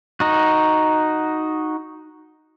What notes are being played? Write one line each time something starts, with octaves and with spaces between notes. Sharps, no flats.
D#4 F#4